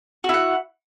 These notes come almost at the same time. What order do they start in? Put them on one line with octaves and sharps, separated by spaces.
F#4 E4 F#5